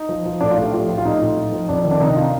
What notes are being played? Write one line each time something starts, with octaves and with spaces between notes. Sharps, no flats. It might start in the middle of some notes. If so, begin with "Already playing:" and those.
Already playing: D#4
F3
F3
A2 D4
F4
A2
G4
F3 F4
F3
F4
A2 D#4
A2
F3
F3
F2 D4
D#3
D4
C3 D#4
F4